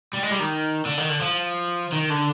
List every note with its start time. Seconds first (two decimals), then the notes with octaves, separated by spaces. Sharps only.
0.13 G3
0.23 G#3
0.31 G3
0.39 D#3
0.85 D3
0.97 D#3
1.09 D3
1.21 F3
1.93 D#3
2.11 D3